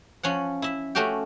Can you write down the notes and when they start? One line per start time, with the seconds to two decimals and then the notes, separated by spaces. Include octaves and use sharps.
0.23 F3 C#4 C#5 F#5
0.62 E4 E5
0.95 A3 C#4 F#4 G4 G5